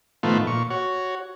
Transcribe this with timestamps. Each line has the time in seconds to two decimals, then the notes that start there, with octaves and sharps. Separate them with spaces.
0.23 A2 D#3 F3 A3 B3 F4
0.47 A#2 C#6
0.70 F#4 C#5